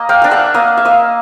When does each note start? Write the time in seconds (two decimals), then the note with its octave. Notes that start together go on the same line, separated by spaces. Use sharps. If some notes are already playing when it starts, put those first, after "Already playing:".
Already playing: A#3 D#5
0.09 F5 G5
0.22 D4 F5
0.31 E5 F#5
0.54 A#3 D#5 F5
0.77 E5
0.85 A#3 D#5 F5